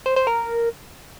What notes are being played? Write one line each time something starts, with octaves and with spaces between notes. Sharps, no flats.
C5
C5
A#4